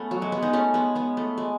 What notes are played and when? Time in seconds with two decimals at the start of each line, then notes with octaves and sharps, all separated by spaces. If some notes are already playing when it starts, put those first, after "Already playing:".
Already playing: A3 B3 C#4
0.11 F#3
0.22 G#3
0.32 G#3 B3
0.42 B3 D#4
0.53 A3 C#4
0.74 G#3 B3
0.95 G#3 B3
1.17 A3
1.38 G#3